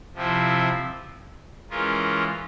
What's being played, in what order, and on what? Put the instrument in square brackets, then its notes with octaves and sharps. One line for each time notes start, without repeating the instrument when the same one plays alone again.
[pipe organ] C3 F3 C4 E4
E3 G#3 C#4 F4 A#4